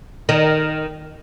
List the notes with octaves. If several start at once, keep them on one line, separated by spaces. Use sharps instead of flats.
D#3